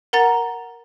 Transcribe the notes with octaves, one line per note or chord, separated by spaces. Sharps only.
A#4 F#5 A#5 A6